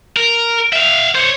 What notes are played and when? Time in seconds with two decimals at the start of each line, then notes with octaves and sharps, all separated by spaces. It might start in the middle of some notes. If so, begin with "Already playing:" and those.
0.16 A#4
0.73 E5 F5
1.15 C5 C#5